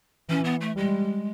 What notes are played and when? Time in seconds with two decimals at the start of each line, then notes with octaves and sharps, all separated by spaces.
0.29 E3 C#4
0.45 B3
0.61 A3
0.77 G3 G#3